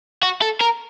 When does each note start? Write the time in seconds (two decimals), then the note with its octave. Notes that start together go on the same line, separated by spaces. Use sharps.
0.23 F#4
0.42 A4
0.61 A#4